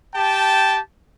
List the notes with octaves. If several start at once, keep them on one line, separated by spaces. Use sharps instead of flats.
G4 G5 A5